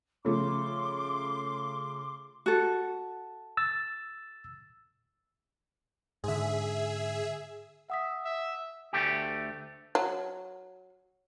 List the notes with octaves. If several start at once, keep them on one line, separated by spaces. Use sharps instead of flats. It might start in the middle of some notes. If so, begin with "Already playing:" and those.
C#3 F3 A3 C6 D6
F#4 A4
E6 A6
G#2 D3 G#4 E5
E5 F#5 D#6 B6
E5
D2 A3 G4
F#3